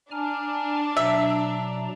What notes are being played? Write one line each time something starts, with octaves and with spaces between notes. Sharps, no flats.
D4 G#5 A#5 F6
B2 F#3 E5 A#5